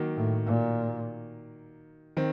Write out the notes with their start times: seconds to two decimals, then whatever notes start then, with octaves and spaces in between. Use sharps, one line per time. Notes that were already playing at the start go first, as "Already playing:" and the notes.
Already playing: D#3 F#3 A#3
0.17 A2
0.46 A#2
2.17 D#3 C4